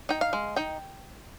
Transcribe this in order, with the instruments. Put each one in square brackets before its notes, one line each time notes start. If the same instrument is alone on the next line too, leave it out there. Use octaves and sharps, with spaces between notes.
[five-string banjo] D#4 G5
F5
G#3
D#4 G5